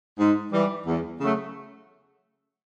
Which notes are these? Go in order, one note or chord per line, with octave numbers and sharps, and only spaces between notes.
G#2
E3 G3
E2
C#3 F#3 A3